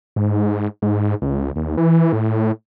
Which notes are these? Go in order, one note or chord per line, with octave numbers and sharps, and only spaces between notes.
G#2
G#2
C#2
D#2
E3
A2